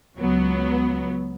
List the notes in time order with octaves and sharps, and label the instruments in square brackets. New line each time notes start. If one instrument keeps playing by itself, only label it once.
[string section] C#2 F#3 B3